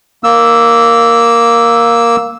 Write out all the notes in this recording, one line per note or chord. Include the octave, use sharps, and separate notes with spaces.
A#3 E6